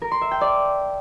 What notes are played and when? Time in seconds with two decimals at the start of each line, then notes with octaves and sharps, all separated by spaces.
0.02 A#4
0.11 C6
0.21 E5
0.31 G5
0.41 D5